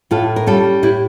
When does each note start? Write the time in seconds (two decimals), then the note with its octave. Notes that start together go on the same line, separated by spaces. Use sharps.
0.11 A2 F4 A4
0.36 A#4
0.46 G3 C#4 F4 A4
0.83 A2 E4 G4